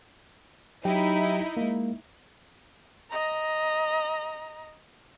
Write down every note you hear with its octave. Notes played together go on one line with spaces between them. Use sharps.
F#3 D#4 E4 G4 G5
G#3 A#3
D#5 A#5